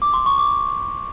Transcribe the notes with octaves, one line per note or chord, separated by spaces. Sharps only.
D6
C6
C#6
D6